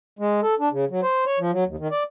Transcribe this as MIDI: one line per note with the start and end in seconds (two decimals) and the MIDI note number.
0.19 0.40 56
0.42 0.55 69
0.59 0.69 62
0.71 0.85 49
0.90 1.01 54
1.02 1.24 72
1.26 1.39 73
1.39 1.51 53
1.52 1.64 54
1.66 1.76 39
1.79 1.88 51
1.91 2.03 74